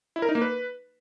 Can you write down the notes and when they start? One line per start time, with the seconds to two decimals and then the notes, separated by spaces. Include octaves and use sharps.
0.16 E4
0.22 A#4
0.29 D#4
0.35 A#3
0.41 B4